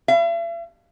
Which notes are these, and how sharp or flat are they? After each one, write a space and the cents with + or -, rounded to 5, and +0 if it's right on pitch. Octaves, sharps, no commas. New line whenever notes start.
E5 +45